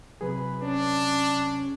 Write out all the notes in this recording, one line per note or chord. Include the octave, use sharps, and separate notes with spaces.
C3 F#3 G#4 B4
C#4 D4